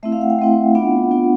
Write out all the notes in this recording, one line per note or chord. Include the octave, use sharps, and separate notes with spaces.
A3 C4 E4 E5
F5
F#5
G5
A3 C4 E4
B3 D4 F4 F#5
B3 D4 F4